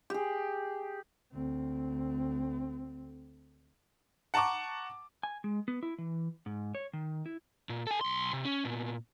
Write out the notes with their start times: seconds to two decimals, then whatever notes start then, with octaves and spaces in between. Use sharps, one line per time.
0.10 G4 G#4
1.32 D2 C4
4.34 F#5 A5 A#5 C#6 D6
5.23 G#5
5.44 G#3
5.68 B3
5.83 E4
5.98 E3
6.46 G#2
6.75 C#5
6.93 D#3
7.26 E4
7.69 A#2
7.87 A4 G#5
8.01 B1 C6
8.33 C3
8.45 C#4
8.65 A#2 B3